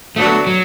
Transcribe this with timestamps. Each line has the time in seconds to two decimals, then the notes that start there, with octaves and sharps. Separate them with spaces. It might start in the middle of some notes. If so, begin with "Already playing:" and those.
0.16 D3 F#3 A3 B3 D4 F#4
0.47 F#3